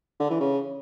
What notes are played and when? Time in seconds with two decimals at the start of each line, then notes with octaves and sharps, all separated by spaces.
0.20 D3
0.30 E3
0.40 C#3